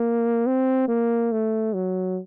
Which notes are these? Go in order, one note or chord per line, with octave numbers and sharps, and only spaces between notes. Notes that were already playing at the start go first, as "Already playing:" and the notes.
Already playing: A#3
C4
A#3
A3
F#3